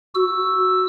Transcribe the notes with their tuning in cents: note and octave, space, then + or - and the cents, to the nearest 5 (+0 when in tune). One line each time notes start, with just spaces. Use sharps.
F#4 +0 E6 +0